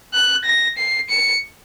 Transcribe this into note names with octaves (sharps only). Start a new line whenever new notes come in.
F#6
A#6
C7
C#7